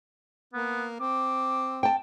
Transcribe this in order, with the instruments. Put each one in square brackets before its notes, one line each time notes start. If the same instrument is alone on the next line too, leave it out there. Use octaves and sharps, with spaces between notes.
[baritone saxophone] A#3 [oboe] B3
[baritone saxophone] C4 [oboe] D6
[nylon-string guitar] G5 A5